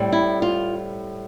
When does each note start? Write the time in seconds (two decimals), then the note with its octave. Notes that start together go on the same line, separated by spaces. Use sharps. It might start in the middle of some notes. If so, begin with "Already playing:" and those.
Already playing: A2 G3 C4
0.12 E4
0.42 F4